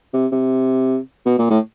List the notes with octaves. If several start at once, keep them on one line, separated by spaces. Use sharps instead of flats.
C3
C3
B2
A#2
A2